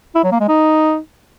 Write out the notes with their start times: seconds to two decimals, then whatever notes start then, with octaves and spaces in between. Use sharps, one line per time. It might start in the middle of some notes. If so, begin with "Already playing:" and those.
0.15 E4
0.24 F#3
0.32 A#3
0.40 G#3
0.49 D#4